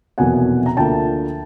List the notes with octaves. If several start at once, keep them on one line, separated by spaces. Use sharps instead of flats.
F1 E2 B2 F#3 A#3 F#5 G#5
A#5
D2 D3 F3 A#3 G5 A5